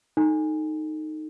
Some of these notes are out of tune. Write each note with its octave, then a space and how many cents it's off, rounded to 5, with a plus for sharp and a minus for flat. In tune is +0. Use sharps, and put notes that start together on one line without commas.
D#4 -5 A4 +0